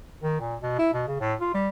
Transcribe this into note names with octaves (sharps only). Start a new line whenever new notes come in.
D#3
A#2
B2
E4
B2
C#3
A2
F4
G3